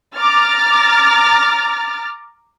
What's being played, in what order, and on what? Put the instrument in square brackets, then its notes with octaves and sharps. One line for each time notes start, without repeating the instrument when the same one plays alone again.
[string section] A#5 D6 F6 A6